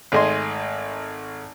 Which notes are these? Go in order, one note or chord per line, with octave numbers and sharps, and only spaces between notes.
G#1 A3 G#4 D#5 G#5 C6